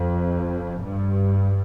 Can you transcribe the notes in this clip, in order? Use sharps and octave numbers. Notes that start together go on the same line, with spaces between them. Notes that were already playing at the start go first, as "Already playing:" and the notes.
Already playing: F2
G2